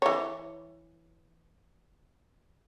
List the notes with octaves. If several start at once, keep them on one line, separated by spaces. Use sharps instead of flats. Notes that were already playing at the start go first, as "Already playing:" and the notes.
E3 C#5